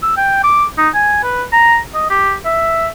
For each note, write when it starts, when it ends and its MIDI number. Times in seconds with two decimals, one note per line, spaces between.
0.03 0.15 88
0.17 0.41 79
0.43 0.65 86
0.78 0.89 63
0.95 1.21 80
1.23 1.43 71
1.53 1.78 82
1.94 2.07 75
2.10 2.34 67
2.45 2.88 76